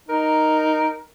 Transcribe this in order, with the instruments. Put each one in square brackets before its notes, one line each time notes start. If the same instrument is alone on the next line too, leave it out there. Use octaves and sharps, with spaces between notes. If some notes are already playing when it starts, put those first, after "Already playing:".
[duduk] D#4 [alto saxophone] A#4